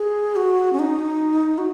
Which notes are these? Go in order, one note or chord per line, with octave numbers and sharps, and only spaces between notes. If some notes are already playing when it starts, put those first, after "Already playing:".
Already playing: G#4
F#4
C#4
D#4
F#4